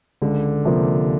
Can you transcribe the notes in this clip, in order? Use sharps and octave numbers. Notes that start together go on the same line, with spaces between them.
C#2 D3
C3 F3 A#3